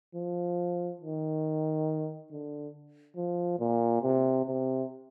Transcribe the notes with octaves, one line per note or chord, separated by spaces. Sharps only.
F3
D#3
D3
F3
A#2
C3
C3